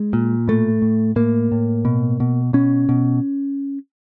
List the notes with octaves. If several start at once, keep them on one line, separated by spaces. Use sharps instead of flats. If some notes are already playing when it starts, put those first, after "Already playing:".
Already playing: G#3
A#2
A2 A3
A2
A2 A#3
A2
B2
B2
B2 C#4
B2